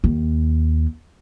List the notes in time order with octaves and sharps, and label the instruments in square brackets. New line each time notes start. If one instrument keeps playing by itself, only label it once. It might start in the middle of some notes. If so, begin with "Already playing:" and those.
[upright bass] D#2